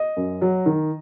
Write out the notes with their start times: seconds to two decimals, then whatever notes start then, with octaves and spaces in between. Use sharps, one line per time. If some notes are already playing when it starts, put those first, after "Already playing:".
Already playing: D#5
0.17 F#2
0.41 F#3
0.66 D#3